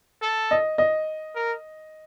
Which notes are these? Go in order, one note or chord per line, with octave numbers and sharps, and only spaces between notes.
A4
D#5
D#5
A#4